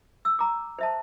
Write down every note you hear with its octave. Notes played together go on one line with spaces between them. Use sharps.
E6
A#5 D6
C5 E5 A5